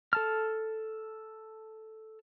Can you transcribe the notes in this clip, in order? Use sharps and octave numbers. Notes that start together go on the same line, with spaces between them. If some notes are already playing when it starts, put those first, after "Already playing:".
A4 A5 F6